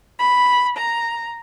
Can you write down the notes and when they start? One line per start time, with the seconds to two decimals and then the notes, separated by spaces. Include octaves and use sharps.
0.19 B5
0.77 A#5